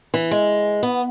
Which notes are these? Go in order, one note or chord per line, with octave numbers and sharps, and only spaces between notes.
E3
G#3
B3